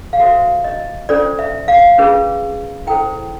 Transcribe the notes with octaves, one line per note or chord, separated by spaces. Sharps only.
F5
F#4 A4 C5 E5
D#5
C#4 F4 A4 C5 D5
E5
F5
C#4 F4 G#4 B4
E4 A4 C5 G5